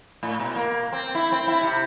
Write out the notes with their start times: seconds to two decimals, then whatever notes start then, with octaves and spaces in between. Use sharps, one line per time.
0.23 A2
0.40 B2
0.56 A#3
0.93 C4
1.15 E4
1.32 C4
1.48 E4
1.62 C3